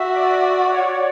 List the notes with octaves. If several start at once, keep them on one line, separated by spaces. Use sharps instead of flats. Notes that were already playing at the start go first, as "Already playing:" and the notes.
Already playing: F#4 E5
D5
C#5